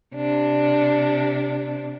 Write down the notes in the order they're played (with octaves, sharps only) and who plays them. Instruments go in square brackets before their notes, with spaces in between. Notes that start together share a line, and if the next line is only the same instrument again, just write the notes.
[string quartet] C3 D4